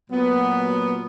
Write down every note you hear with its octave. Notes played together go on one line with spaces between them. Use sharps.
A#2 F#3 B3